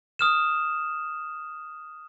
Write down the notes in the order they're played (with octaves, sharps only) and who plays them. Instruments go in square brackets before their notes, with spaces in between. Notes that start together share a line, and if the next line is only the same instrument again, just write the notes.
[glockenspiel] D#6 F6 E7